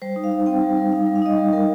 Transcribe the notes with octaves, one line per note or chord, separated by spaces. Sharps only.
G3 C5
D#4
F5
D#4
C4 G5
G3
G3
D#4 F5
G5
G3
F5
D#4 D#5
G3
G3 A#4